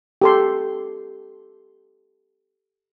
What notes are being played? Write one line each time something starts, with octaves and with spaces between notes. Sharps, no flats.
G4 A4 C6